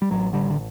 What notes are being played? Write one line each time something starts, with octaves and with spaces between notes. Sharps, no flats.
G3
A1 F#3
D3 G3
D3